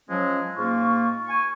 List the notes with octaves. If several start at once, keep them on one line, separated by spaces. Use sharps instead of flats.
F3 F#3 G#3 C#4
G#2 A#3 F4 C#6
G#5 C#6